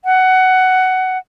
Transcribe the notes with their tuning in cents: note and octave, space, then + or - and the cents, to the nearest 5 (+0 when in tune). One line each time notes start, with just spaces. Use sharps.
F#5 +15